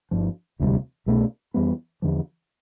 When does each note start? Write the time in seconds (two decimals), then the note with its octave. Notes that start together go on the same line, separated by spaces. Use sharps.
0.11 G1 G2 F3
0.59 E1 D2 C3 G3
1.06 C2 B2 A3
1.54 F2 E3 G3 B3
2.02 E2 D3 F3